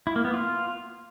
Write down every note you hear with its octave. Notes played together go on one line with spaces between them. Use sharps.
E4
A#3
B3
F4